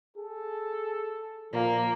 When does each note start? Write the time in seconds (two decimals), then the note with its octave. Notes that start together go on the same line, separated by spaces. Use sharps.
0.17 G#4 A4
1.53 A#2 F3 A#3